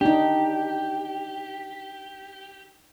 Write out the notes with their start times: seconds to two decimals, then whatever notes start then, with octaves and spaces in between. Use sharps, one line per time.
0.01 D4 D#4 G4